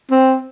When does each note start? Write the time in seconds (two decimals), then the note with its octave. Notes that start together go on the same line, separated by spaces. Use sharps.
0.11 C4